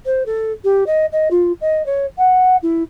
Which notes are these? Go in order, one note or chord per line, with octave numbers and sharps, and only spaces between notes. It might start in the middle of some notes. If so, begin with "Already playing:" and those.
C5
A4
G4
D#5
D#5
F4
D#5
C#5
F#5
E4